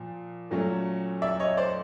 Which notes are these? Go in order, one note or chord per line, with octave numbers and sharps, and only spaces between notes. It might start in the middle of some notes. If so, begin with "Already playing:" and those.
Already playing: A#2 F3
A#2 F#3 A3 C#4
D5 E5
C#5 D#5
C5 D5